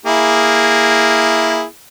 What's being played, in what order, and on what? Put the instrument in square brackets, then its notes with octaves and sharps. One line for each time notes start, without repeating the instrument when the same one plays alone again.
[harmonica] A#3 E4 G#4